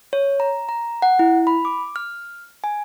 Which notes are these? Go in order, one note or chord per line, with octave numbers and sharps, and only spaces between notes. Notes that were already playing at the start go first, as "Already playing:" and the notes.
C#5
A#5
A#5
F#5
E4
B5
D6
F6
G#5